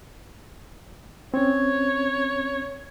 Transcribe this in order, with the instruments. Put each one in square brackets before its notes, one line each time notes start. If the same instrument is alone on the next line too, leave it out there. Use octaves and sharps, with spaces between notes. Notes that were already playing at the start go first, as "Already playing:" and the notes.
[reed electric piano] C4 C#4 [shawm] C#5